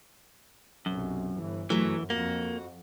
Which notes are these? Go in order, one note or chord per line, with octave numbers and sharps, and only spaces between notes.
B1 F#2 C3
G1 E3
G1 F#2 E3 F#3 A3
F2 A#3 F#4